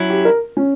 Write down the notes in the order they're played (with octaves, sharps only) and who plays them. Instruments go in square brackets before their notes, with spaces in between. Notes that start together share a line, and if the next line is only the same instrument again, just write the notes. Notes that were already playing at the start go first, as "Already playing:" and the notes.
Already playing: [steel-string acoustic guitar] F#3 C#4 E4
[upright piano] G4
A#4
C#4